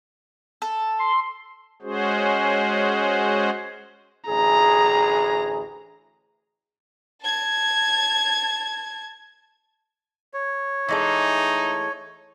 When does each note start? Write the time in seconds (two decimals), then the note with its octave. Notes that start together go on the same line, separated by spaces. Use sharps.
0.62 A4
0.99 C6
1.82 G#3 C#4 F#4 G#4 C5
4.29 A1 D2 G#4 A#5
7.22 A5 G#6
10.34 C#5
10.89 E3 G#3 A3 D#4